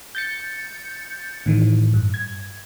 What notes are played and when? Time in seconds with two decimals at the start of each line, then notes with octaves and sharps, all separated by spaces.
0.15 G6 A6 C#7
1.46 A2 D#3 E3
1.94 G2
2.14 G#6